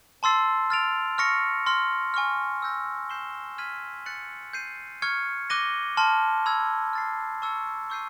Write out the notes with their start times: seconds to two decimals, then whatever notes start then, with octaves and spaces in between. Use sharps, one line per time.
0.23 A5 C6 E6 A6 C7
0.70 F6 A6 D7 F7
1.18 C#6 F6 A#6 C#7
1.66 C6 F6 A#6
2.14 G#5 C#6 F6
2.62 E6 G6 A#6
3.10 G6 C7 E7 G7
3.58 F6 G#6 B6 D#7 F#7
4.06 F#6 A6 C#7 F#7
4.53 G6 C7 D#7
5.02 C#6 F6 G#6 C#7
5.50 D6 F#6 A#6 D#7 G7
5.97 A5 C6 F6
6.46 B5 E6 G#6
6.93 F6 A6 C7
7.42 A5 C#6 E6 G#6 C#7
7.90 C#6 E6 G6 C7 D#7